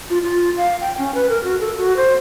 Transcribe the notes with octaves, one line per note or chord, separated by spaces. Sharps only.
F4
F4
F5
G5
C#4
B4
A#4
F#4
A4
F#4
C5